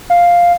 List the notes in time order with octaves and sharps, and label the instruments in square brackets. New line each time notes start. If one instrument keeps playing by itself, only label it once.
[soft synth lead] F5